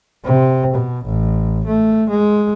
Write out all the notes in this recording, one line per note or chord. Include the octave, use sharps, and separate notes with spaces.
C3
B2
A1
A3
G#3